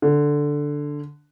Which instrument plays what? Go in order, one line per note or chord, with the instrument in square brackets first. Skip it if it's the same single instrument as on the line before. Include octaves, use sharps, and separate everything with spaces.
[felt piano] D3